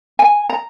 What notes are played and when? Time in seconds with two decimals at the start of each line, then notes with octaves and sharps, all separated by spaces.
0.19 G#5
0.49 A#5